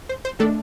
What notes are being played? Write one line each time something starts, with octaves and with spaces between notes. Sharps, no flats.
C5
C5
D#3 A3 D4 A4